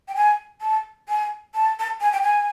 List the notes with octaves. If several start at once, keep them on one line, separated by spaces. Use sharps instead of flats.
G5
G#5
A5
G#5
A5
A5
G#5
G5
G#5